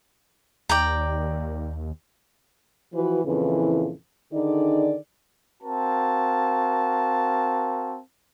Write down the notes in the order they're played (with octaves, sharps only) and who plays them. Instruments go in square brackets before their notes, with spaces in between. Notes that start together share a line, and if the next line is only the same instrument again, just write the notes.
[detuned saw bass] D#2 [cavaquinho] D5 G5 A#5
[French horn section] E3 F3 F#4 B4
F2 A#2 C#3 E3
D3 D#3 D#4 G#4 D5
[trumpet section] C4 F#4 A#4 F5 A5